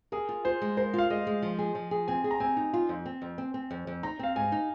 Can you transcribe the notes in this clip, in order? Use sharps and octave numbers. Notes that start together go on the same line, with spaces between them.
G#4 A#4
F4
F4 C5
G#3
A#4 C5
F4 F5
G#3 D#5
G#3
F3
G#4
F3
G#4
C4 G#5
G#4
A#5
C4 G#5
D#4
F4
F2
C4
F2
C4
C4
F2
F2
D#4 A#5
C4 F5
G#2 G#5
D#4